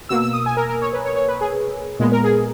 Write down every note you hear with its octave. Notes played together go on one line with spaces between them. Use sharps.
B2 A#3 E6
E6
D#6
G#5
A#4
A#4
C#5
B4
C#5
C#5
B4
G#4
A#2 G#3 B3
A#4
G#4